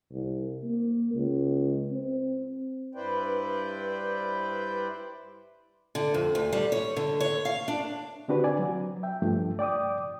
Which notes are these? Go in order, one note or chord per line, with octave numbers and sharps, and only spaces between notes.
C2
A#3
C#2
C4
G2 E4 B4 C5 D5 G5
D3
F2
D2
G3
C#5
D3
C#5
F5
D4
D3 C4 D4 F#4 G4 B4
D5 G#5
F#3
E5 G5
G2 F3 A3
D5 G5 D6 D#6